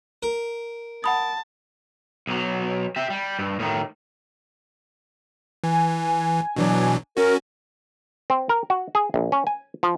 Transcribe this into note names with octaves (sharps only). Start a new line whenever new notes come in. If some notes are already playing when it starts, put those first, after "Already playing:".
A#4
F#5 A5 B5 D#6
B1 F#3
G4 E5
G3
G2
A2 D#3
E3 G#5
B2 E3 F#3 D4
C#4 F#4 A#4
C4
A#4
F#4
G#4
A#1
C#4
G#5
F3